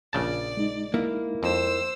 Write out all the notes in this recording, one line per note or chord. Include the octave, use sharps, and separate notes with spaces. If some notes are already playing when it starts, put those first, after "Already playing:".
A#1 C#3 D5 A5
G#3 D#4
A#3 E4
F2 C5 E6